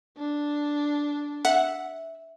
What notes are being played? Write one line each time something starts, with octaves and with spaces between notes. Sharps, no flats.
D4
E5 F#5